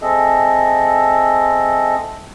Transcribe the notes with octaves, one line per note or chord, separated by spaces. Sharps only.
C4 G#4 A4 D#5 E5